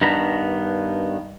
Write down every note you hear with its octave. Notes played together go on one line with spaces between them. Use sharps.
G2 D#3 B3 D4 A#5 B5